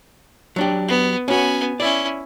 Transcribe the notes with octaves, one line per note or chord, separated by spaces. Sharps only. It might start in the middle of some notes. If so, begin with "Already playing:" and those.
F#3 D4 G4
B3
B3 C#4 F#4 G#5
C#4 E4 D5